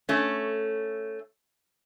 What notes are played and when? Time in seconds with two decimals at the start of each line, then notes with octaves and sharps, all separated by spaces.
0.09 A3 C#4